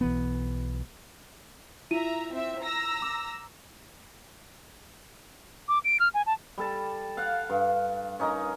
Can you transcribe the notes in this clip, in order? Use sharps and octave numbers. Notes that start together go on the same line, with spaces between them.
B1 E3 B3
E4 F4 E5 A#5 D#7
C4 E5
A#5 E6 A#6
D6
D6
D7
F6
G#5
A5
G3 A4 A5
F5 F#5
G2
C#4 D#4 A#4 D#5